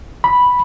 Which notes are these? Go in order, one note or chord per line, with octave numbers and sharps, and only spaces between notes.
B5